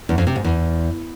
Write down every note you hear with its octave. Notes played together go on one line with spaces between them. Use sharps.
E2
F2
C3
G#2
E2